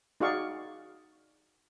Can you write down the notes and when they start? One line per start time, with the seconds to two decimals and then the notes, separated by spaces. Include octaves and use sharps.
0.20 D#4 F#4 G#4 D5 F5 C#6